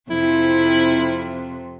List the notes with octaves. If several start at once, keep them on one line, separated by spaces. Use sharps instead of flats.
F2 C3 E4